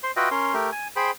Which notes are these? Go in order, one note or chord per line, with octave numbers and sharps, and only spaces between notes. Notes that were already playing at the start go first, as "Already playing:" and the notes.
C5 C6
F4 F#4 B4 D#5 E5 G5
C#4 A#4 C6
A3 G4 A#4
G#5
G#4 C5 G5 B5